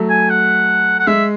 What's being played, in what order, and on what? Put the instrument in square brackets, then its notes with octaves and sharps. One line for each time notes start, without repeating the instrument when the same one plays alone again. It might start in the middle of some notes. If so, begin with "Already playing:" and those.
Already playing: [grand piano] F#3 A3
[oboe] G#5
F#5
F#5
[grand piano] G#3 [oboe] E5